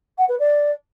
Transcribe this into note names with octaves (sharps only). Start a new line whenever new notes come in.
F#5
B4
D5